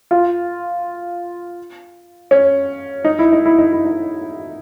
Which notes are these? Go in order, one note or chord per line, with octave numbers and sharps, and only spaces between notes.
F4
C#4
D#4
E4
D#4
E4
D#4
E4
D#4